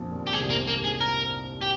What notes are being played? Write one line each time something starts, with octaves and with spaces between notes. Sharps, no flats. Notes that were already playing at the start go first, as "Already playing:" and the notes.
Already playing: A#1 F2 A#2 F3
D#2 D#3
G4
C2 C3 G#4
G#2 A#3
A#1 A#2
A#3
G#1 G#2
G#4
A#4
G4